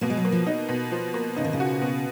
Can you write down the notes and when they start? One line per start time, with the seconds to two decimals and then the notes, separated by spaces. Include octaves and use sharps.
0.01 B2 A#3
0.10 G#3
0.17 F#3
0.25 A#3
0.32 F3
0.47 D#4
0.69 B2
0.92 F3
1.14 A#3
1.37 C#3 D#4
1.44 D#3
1.53 C#3
1.60 F#4
1.81 B2